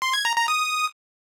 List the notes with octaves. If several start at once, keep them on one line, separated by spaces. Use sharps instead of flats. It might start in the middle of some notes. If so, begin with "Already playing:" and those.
C6
G#6
A#5
A#5
D#6